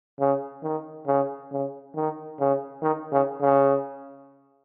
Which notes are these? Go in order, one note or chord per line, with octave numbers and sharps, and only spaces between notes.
C#3
D#3
C#3
C#3
D#3
C#3
D#3
C#3
C#3